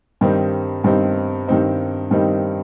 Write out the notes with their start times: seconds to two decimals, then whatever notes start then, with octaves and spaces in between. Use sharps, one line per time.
0.21 G2 D#3 G3 C4 D#4
0.84 G2 D#3 G3 C4 D#4
1.48 G2 D#3 G3 C4 D#4
2.11 G2 D#3 G3 C4 D#4